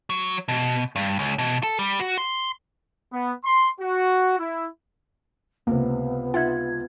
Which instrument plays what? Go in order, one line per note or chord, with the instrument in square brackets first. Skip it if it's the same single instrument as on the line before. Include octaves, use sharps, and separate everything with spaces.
[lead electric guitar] F#3
B2
G2
C#2
B2
A4
G3
F#4
C6
[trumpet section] B3
C6
F#4
E4
[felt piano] C#2 C3 [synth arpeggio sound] A#3 [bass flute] B3
[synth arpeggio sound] D#4 E5 F#5 [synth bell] F4 G#6